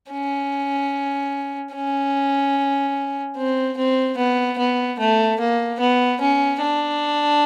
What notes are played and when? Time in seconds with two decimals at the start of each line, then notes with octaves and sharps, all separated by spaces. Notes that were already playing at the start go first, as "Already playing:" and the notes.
0.12 C#4
1.75 C#4
3.36 C4
3.77 C4
4.18 B3
4.58 B3
4.99 A3
5.39 A#3
5.80 B3
6.20 C#4
6.61 D4